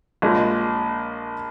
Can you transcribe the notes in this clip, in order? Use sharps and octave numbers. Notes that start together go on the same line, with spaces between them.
A#1 A#2 G#3